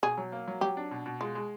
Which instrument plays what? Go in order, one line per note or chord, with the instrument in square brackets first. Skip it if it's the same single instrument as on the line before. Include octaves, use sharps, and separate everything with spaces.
[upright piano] B2 [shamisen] G#4
[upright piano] F#3
A#3
F#3
[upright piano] F#3 [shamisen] G4
[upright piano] D4
B2
B2
[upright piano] G#3 [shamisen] F4
[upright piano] G#3